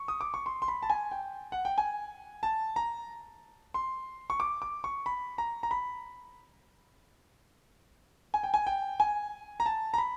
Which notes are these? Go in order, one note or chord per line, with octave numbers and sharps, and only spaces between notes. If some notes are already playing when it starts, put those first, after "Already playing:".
Already playing: C#6
D#6
D6
C#6
C6
C6
B5
A5
G#5
G5
F#5
G5
G#5
A5
A#5
C6
C#6
D6
D6
C#6
B5
A#5
A#5
B5
G#5
G5
G#5
G5
G#5
A#5
A5
A#5
B5